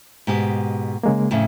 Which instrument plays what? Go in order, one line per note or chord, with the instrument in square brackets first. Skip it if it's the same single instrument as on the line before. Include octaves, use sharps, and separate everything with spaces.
[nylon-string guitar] G#2 B2 G4
[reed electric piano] C#3 G#3 A#3
[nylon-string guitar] F2 A2 C#3